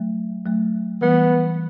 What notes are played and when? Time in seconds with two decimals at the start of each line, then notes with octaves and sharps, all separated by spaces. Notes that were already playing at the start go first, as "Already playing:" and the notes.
Already playing: F#3 A3
0.46 F#3 A3
1.01 E3 G3 B3